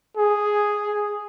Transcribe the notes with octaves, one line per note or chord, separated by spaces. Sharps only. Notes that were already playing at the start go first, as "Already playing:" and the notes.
G#4